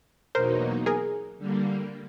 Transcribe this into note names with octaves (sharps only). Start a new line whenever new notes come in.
E2 B2 F#3 A#3 D#4 A#4 C5
G#4 A#4
D3 G3 A#3